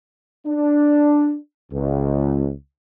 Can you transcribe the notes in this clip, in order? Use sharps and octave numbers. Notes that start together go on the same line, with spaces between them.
D4
C#2